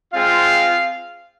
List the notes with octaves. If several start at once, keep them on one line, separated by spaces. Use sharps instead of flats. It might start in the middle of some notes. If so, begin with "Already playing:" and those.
G#3 C4 F4 F5